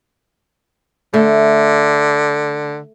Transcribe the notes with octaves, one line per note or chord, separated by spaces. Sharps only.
D3 A3